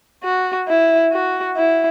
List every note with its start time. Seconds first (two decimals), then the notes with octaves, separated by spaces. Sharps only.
0.23 F#4
0.68 E4
1.13 F#4
1.57 E4